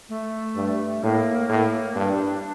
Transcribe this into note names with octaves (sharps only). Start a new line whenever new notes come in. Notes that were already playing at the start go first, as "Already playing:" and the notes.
A3
G2
A2 A#3
A2
G2 D4